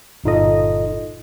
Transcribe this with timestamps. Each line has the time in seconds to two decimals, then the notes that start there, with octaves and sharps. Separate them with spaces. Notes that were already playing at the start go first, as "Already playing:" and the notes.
0.24 G1 A#2 D#4 F4 A4 D#5